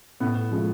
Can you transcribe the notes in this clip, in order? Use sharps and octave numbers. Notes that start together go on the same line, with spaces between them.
A2 B3
F3 G#3